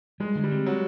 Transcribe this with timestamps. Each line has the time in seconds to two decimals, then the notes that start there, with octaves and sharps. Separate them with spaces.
0.20 G3 G#3
0.35 D3
0.44 G3
0.51 C4
0.66 F#3